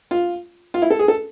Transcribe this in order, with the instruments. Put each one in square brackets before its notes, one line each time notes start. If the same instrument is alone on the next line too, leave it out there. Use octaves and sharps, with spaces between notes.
[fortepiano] F4
F4
E4
A4
G#4
A4